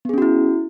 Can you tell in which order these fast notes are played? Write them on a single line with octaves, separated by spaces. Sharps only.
B3 G#4 C#4 F#4 E4